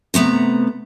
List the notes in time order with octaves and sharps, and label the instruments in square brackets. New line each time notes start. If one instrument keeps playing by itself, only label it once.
[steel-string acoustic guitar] C3 A3 B3 A#5